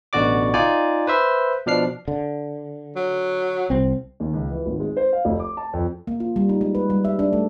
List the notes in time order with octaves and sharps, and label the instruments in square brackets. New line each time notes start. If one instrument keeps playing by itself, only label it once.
[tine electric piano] A1 B2 D3 F#4 D5 D6
D#4 F4 D5 G#5
B4 C5 E5
B2 F3 D4 F6 C7
[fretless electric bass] D3
[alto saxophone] F#3
[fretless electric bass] C2 C4
[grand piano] D#2
C#2
E3
G#1
G#3
C5
F5
F1
D6
A5
F2
[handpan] A#3
F4
G3
D#4
G#3
B4
G3
E5
D4
A3